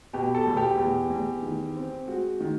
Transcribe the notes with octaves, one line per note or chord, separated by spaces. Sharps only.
B2 G4
A4
E2
G4
E2
E2
D#3
C4
G#3 F#4
D#3